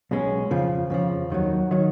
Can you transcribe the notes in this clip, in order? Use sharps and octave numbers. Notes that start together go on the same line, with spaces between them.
B1 B2 G#3 C#4
F2 C#3 F3
F2 C#3 F3
D#2 D#3 F#3
D#3 F#3